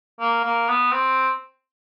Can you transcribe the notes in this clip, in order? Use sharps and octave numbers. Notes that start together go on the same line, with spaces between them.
A#3
A#3
B3
C4